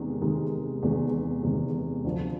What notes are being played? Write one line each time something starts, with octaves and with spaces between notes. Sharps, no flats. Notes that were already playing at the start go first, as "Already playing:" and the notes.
Already playing: E2 C3 D#3 G#3
E2 C3 D#3 G#3
E2 C3 D#3 G#3
E2 C3 D#3 G#3
D2 D3 F3